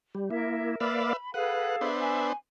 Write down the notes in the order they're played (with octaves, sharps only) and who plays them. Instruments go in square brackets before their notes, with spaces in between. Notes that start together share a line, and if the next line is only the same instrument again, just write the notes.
[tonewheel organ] G3
[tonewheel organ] A#3 E4 [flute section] A#4 E5
[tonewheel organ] A#3 D5 F5 [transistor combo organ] B4 E5 [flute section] B5
[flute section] G#4 A4 F5 [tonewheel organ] B4 [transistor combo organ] F#5
[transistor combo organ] B3 D4 C5 [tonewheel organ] E5
[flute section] G#5